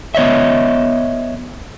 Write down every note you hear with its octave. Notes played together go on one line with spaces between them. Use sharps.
B3 C#5 D#5 E5